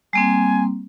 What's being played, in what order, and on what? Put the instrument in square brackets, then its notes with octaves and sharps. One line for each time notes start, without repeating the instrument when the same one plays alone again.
[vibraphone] G3 A#3 C4 [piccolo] G#5